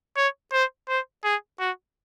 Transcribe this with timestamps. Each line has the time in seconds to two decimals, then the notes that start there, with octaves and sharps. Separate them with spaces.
0.17 C#5
0.53 C5
0.88 C5
1.24 G#4
1.60 F#4